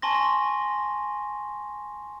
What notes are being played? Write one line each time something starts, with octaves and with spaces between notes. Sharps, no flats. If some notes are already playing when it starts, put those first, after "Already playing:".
G#5 A5 C6 C#6 A#6